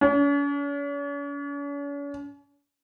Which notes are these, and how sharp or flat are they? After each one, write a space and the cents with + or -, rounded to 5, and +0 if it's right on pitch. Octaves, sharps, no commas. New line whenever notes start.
C#4 +45